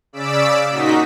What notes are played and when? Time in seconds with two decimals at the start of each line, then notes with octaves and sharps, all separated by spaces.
0.13 C#3 D5 E6 B6 D7
0.70 A#2 D#4 F#4 D#5 B6